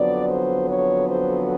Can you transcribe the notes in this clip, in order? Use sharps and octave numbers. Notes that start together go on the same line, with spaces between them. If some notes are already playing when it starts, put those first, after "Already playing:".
Already playing: F2 D3 F#3 B3 D5
C5
C#5
C5